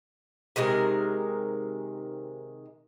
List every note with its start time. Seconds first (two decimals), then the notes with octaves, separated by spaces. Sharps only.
0.56 C3 D#3 G#3 A#4